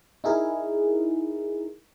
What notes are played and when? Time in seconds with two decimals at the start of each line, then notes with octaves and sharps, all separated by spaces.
0.24 D#4 E4 G#4 A#4